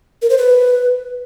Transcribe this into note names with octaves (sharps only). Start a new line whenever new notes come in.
A#4
C5
B4